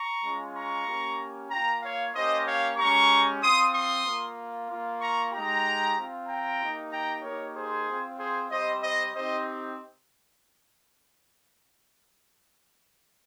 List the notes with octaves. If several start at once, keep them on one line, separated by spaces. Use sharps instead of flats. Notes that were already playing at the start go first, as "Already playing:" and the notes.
Already playing: A#5 C#6
G#3 C#4 F4
A#5 C#6
A#3 C#4 G4
A#3 F4 G5 A#5
C#5 F5
A#3 C#4 G4 C5 D#5
C#5 F5
G#3 C#4 G4 A#5 C#6
C4 F4 C6 D#6
C6 D#6
A#3 F4
A#3 F4
A#5 C#6
G#3 D#4 G4 G5 A#5
C4 F4
G5 A#5
A#3 D#4 G4
G5 A#5
A#3 D#4 G4 A#4 C#5
G#4 C5
C4 F4
G#4 C5
G3 C4 G4 C5 D#5
C5 D#5
C4 D#4 G4 C5 D#5